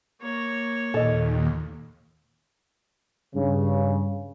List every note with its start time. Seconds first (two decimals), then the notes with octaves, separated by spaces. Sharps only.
0.21 A#3 C#5
0.94 D#2 A#2 A4 D#5
3.34 G2 C#3